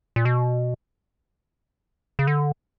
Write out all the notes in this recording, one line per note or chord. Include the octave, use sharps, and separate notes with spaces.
A#2
B2
C#3
D3